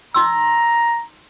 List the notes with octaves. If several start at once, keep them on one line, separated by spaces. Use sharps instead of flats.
D#4 A#5 C6 E6